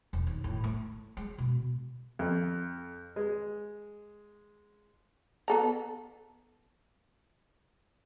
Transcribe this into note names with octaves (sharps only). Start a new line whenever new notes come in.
E1
D#2
A2
A3
G#3
B2
F2
G#3
B3 A4 A#5